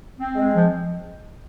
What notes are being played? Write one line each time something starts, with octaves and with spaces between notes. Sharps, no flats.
C4
G#3
F3